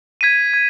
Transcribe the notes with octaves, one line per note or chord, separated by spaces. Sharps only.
G#6 B6 D#7
G#6